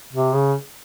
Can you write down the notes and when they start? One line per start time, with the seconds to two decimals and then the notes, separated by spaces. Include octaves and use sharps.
0.13 C3
0.35 C#3